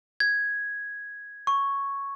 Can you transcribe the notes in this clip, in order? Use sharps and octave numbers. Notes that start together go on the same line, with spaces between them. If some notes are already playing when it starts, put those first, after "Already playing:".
G#6
C#6